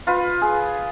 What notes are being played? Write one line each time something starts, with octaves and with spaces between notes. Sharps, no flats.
F4 B4
G#4